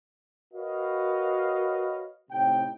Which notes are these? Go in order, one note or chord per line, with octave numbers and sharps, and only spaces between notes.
F#4 A#4 B4 C#5 D#5 F5
A2 C3 D#4 G5